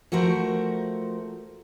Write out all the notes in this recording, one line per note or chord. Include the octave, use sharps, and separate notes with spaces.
F3 A3 F#4 A#4 C5